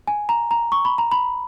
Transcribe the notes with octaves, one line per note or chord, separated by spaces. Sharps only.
G#5
A#5
A#5
C#6
B5
A#5
B5